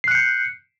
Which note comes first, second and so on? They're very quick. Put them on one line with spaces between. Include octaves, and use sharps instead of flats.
C7 F#6 C#7 G6